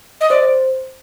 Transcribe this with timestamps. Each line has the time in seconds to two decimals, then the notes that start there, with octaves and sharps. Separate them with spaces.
0.21 D#5
0.29 C5 D5